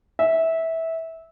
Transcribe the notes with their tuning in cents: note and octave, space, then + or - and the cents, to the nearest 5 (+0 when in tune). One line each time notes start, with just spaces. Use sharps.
E5 -15